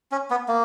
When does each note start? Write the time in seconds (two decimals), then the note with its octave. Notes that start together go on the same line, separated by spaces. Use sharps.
0.12 C#4
0.30 B3
0.48 A#3